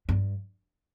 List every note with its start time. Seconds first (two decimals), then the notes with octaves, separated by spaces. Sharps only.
0.09 G2